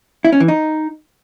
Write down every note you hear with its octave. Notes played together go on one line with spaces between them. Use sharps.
E4
C#4
E3
D#4